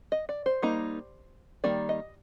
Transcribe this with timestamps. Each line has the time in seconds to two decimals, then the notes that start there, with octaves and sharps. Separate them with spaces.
0.12 D#5
0.29 D5
0.46 C5
0.62 G3 A#3 D#4
1.64 D#3 G3 A#3 D5
1.89 D#5